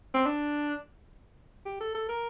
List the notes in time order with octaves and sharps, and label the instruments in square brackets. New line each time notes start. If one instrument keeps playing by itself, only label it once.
[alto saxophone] C4
D4
G4
A4
A4
A#4